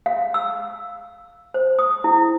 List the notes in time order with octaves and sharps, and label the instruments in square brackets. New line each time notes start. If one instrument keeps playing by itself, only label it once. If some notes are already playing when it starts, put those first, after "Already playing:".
[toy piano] F5
E6
C5
D#6
E4